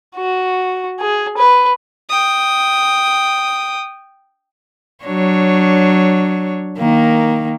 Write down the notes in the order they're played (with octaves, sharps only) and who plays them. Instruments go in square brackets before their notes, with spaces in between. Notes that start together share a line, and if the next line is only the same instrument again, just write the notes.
[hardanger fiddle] F#4
G#4
B4
[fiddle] G5 D#6
[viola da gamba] F#3 D4 C#5
D#3 A#3